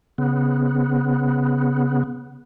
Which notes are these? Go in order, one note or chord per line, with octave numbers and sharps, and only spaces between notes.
C#3 B3